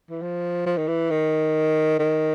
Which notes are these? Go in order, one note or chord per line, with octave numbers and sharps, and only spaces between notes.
E3
F3
F3
D#3
E3
D#3
D#3